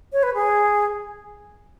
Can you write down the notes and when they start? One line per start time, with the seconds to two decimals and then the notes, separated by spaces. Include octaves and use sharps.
0.13 C#5
0.23 B4
0.34 G#4